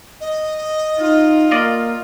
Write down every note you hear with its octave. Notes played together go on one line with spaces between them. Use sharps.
D#5
D#4 F4
A#3 D5 D#5 F5